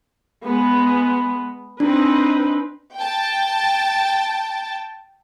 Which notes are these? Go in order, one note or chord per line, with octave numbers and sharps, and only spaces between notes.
G#3 B3
C4 D4 D#4 B4
G5 A5